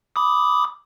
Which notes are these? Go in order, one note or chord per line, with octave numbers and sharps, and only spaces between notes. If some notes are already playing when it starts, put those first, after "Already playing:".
B5 D6 D#6